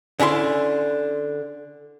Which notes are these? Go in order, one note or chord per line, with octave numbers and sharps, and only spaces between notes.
D3 C#4 E4 C6